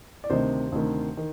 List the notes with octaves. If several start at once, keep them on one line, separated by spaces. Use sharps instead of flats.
D5
D2 C3 D#3 C5 D#5
D2 C3 D#3
D#3